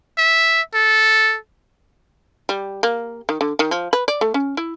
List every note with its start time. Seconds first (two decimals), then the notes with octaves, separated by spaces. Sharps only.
0.18 E5
0.74 A4
2.49 G3
2.83 A#3
3.29 D#3
3.41 D3
3.59 D#3
3.71 F3
3.93 B4
4.08 D5
4.21 A3
4.34 C#4
4.57 E4